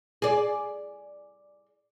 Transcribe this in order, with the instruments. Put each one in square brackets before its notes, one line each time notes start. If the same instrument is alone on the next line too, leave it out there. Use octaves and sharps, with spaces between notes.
[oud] G#4 D5